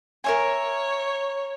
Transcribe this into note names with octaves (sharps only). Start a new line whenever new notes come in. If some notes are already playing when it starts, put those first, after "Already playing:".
A#4 C#5 E5 G#5